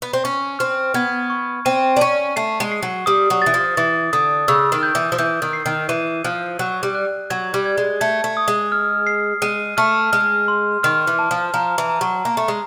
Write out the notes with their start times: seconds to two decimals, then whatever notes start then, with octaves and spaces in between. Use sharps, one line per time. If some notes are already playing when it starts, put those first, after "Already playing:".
0.02 B3
0.13 C4
0.24 C#4 C#6
0.59 C4 F6
0.94 B3 G#6
1.30 C#6
1.65 C4 D#7
1.96 D4
2.01 C#4 D#7
2.36 A3 C7
2.60 G#3
2.72 C7
2.83 F#3
3.06 G3 D#6
3.30 F#3
3.42 E3 A6
3.54 F3
3.77 E3 A6
4.13 D3 D#6
4.48 C#3 E6
4.72 D#3
4.83 G6
4.95 E3
5.12 F3
5.18 E3 G6
5.42 D#3
5.53 C7
5.66 D#3
5.89 E3 D#7
6.25 F3 F#6
6.59 F#3 F#6
6.83 G3
6.95 F#6
7.30 F#3 G#6
7.54 G3
7.66 G#6
7.78 G#3
8.01 A3 G#6
8.24 A3
8.37 D#6
8.48 G#3
8.72 F6
9.07 C7
9.42 G#3 D#7
9.77 A3 F6
10.12 G#3 F6
10.48 C6
10.83 D#3 F6
11.07 E3
11.19 A5
11.31 F3
11.54 F3 A#5
11.78 E3
11.89 A#5
12.01 F#3
12.25 A#3 A#5
12.37 A3
12.48 G#3